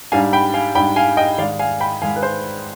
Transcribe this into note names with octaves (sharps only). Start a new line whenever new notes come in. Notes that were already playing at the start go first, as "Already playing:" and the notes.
G#2 G3 D4 F5 G#5
G5 B5
F5 G#5
G#2 G3 D4 G5 B5
F5 G#5
D#5 G5
G#2 D#3 G#3 D5 F5
F5 G#5
G5 B5
G#2 D#3 G#3 F5 G#5
B4
C5